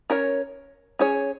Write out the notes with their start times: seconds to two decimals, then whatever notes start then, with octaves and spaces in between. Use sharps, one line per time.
0.10 C#4 A#4 C#5
0.99 C#4 G#4 C#5